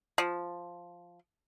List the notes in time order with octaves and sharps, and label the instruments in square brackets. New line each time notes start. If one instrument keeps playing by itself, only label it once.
[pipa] F3